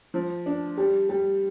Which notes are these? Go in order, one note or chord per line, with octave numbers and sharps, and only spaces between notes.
F3
D4
G3
G3